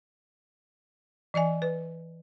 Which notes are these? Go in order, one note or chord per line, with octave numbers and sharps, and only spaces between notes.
E3 D5 D#5 G#5
B4